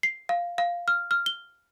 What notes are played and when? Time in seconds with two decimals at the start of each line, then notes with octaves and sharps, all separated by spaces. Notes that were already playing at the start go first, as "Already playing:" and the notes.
0.03 C7
0.29 F5
0.58 F5
0.88 F6
1.11 F6
1.26 G7